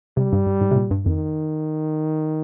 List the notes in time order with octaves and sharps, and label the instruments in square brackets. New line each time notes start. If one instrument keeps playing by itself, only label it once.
[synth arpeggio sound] C3 [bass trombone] G3
[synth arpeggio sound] G2
G2
G#2
C3
A#2
G2
[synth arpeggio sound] F2 [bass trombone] D#3